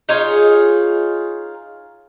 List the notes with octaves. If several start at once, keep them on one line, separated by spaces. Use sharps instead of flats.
D#4 F4 G#4 C#5